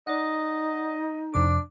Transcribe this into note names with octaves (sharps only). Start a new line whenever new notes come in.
D#4 D5 D#5 F#5
F2 C3 D4 D6